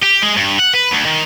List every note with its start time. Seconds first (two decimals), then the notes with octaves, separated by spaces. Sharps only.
0.03 G4
0.23 G#3
0.37 G2
0.60 F#5
0.74 B4
0.91 D2
1.06 D#3